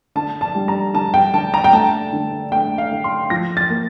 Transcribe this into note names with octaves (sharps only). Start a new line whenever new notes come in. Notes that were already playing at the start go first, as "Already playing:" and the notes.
D3 A5
A5
G3
A#5
D3 A5
G5
D3 A5
A#5
G5
A3 A5
D3
A3 G5
F5
D3
C6
F3 A#6
A6
A#3